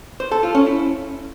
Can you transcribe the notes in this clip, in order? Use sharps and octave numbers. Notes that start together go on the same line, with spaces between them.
C5
A4
F4
C#4
E4